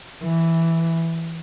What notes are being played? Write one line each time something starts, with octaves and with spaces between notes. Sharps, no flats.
E3